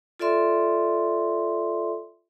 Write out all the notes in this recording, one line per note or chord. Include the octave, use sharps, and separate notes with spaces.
F4 A4 D5 E5 C6